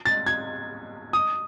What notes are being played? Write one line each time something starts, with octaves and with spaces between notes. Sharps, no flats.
A6
G#6
D#6